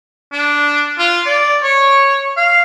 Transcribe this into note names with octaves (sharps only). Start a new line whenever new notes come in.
D4
F4
D5
C#5
F5